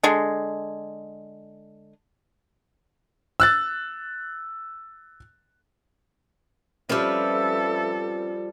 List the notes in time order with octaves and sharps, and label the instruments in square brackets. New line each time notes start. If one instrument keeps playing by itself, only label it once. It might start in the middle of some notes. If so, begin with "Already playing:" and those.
[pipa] D3 G#3
[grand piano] E6 F#6 A6
[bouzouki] F3 G3 [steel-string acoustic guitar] C4 C#4 B4 [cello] A4 [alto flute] E5